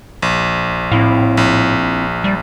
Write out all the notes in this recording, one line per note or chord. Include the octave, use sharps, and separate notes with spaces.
A#1
A2 C4 E4 F5
A#1
G3